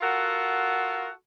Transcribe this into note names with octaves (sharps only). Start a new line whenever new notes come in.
F4 F#4 A4 A#4 F#5